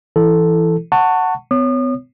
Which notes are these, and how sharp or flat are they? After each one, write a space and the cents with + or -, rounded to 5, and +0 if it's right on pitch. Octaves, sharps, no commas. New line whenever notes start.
E3 +15 E4 +0 A4 +0
F#5 +0 A5 +25 C#6 +0
B3 +40 C#5 +0 D#6 -40